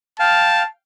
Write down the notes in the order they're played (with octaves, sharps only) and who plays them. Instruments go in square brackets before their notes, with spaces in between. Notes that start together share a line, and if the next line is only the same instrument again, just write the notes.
[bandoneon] F5 G5 F6 [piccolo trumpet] A5